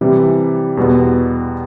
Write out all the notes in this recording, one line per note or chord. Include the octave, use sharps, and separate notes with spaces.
C3 E3 G3
E2 B2 G3 B3